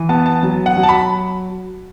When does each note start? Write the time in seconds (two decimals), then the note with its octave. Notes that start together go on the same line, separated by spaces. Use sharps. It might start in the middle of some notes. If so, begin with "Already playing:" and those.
Already playing: E3
0.09 B3 A5
0.26 A5
0.43 F#3
0.66 F#5
0.77 F#3
0.83 A5
0.89 B5